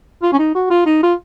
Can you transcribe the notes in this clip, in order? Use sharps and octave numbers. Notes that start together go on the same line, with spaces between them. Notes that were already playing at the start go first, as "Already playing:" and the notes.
F4
C#4
D#4
F#4
F4
D#4
F4